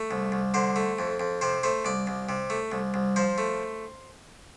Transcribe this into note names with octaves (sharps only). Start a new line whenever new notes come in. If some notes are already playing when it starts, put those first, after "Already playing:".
Already playing: A3
C2
C2
D3 C5
A3
F2
F2
C3 C5
A3 C5
C2 D5
C2
C3
A3
C2
C2
F3 C5
A3